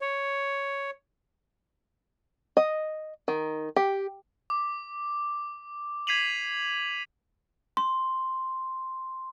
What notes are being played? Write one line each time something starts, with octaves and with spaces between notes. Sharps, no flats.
C#5
D#5
D#3
G4
D6
G#6 B6 C7 D#7 F7 F#7
C6